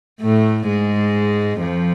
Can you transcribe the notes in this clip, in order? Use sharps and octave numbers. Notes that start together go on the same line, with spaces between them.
A2 A3
G#2 G#3
F2 F3